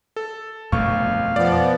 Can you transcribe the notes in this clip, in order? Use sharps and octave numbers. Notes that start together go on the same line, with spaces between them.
A4
G1 F2 B2 A3 F5 C#6
F3 B3 D5